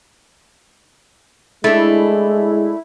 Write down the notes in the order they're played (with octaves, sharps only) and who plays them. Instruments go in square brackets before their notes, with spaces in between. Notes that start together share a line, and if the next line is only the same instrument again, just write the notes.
[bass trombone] G#3 [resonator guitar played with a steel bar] A3 D4 [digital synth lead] E4